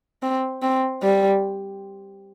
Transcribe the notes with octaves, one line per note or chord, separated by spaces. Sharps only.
C4
C4
G3